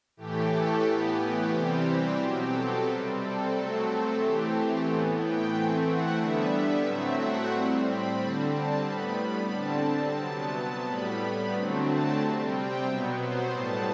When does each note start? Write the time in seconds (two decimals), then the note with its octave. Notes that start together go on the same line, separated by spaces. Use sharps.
0.17 A2 E3 A3 G4
0.50 A4
0.83 A2 E3 B3 G4
1.50 C3 E3 G3 C4 G4
2.17 B2 F#3 C4 G4
2.51 A4
2.84 C3 G3 C4 B4
3.17 A4
3.51 C3 F#3 A3 C4 A4
4.18 E3 A3 C4 G4
4.84 A2 E3 B3 A4
5.18 G5
5.51 E3 A3 C4 G5
5.85 F#5
6.18 D3 G3 B3 E5
6.85 A2 F#3 A3 C4 E5
7.19 F#5
7.52 A2 G3 C4
7.85 B5
8.18 D3 G3 C4 A5
8.52 A5
8.85 A2 G3 B3 B5
9.52 D3 G3 C4 A5
10.19 C3 F#3 B3 A5
10.86 A2 G3 B3 B5
11.53 D3 F#3 A3 C4
11.86 A5
12.20 C3 G3 C4
12.53 G5
12.86 B2 F#3 B3 E5
13.19 C5
13.53 A2 G3 B3 A5